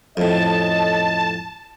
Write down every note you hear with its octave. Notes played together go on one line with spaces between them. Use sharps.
F2 A2 C#4 A4 D#5 A5